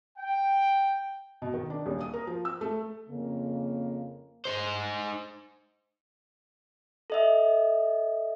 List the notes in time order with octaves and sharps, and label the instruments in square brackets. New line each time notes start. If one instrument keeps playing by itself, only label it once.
[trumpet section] G5
[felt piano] B2
D#3
D4
D#1
D#6
A#4
F3
E6
A3
[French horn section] F2 C#3 A#3
[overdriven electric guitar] D#4 C5
[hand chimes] A4 D#5 E5